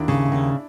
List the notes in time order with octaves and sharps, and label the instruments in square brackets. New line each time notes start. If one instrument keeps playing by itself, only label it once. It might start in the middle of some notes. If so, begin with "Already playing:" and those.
Already playing: [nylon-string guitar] D#2 [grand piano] D4 E4
[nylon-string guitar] C#3
D#2